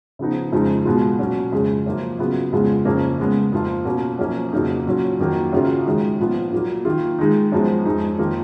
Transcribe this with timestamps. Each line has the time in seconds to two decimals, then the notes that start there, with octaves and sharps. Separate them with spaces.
0.19 C#3 F3 B3 D#4
0.52 F2 C#3 F3 G#3 D#4
0.85 B2 G#3 B3 F4
1.19 A#2 F#3 C#4
1.52 F2 C#3 G#3
1.86 F#2 F3 A#3 F4
2.19 C#3 F#3 B3 F4
2.52 F2 C#3 G#3 B3 F4
2.85 F2 C#3 F3 A#3 C#4
3.18 C#3 G#3 B3
3.52 F2 F3 A#3 F4
3.85 B2 A#3 C#4 F4
4.19 F#2 F3 A#3 C#4
4.53 F2 C#3 F#3 A#3 D#4
4.86 A#2 F#3 C#4 F4
5.19 F2 D#3 F#3 A#3
5.52 F#2 C#3 F#3 C#4 F4
5.85 F#2 D#3 G#3 D#4
6.19 A#2 F3 B3 F4
6.52 A#2 F#3 A#3
6.85 D#3 A#3 F4
7.19 D#3 G#3 D#4
7.52 F#2 F3 G#3 B3
7.85 F2 F3 G#3 D#4
8.18 F2 D#3 A#3 F4